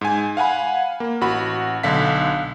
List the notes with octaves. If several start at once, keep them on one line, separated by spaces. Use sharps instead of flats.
G#2 G#5
F5 F#5 G#5 B5
A#3
A1 F#4 B5
B1 D3 F5 B6